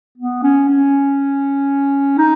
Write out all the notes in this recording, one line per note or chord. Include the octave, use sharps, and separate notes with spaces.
B3
C#4
C#4
D#4